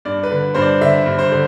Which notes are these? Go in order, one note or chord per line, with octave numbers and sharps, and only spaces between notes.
G2 D5
B4
D3
G2 C5
D5
D3 E5
G2
C5
D3